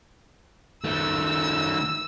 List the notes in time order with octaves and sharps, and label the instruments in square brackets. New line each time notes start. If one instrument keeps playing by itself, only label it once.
[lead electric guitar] D#3 A3 [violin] E6